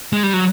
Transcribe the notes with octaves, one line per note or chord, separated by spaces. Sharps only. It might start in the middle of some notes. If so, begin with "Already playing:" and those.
G#3
G3
F#3